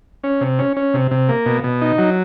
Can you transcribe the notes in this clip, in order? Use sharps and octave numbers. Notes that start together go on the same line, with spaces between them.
C#4
C3
C#4
C#4
C3
C3
A#3
B2
B2
D#4
F#3